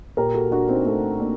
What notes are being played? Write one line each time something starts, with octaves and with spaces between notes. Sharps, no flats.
A#2 G4 A#4
F#4 A4
D4 F#4
C4 D#4
A3 C4
A#3 D4